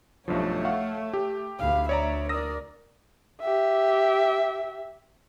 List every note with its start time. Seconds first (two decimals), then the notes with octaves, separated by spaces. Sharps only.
0.28 B1 G2 F3 A3 C#5
0.65 F5 F#5 C#6
1.13 G4
1.59 D2 F5 B5
1.89 C#5 D5 E5 A#5
2.29 A#4 D5 D#6 E6 A#6
3.41 G4 E5